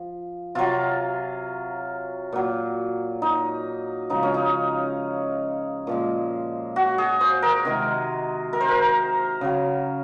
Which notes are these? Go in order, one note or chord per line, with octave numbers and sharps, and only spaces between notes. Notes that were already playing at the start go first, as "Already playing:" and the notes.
Already playing: F3
C3 F#3 F4
A#2 F#3
D#4
C#3 F3 G#3 D#4
C#4
D#4
A#2 F3 G#3
F#4
G#4
C5
A#4
C3 D#3 G#3
A#4
C5
A#4
C#3 F#3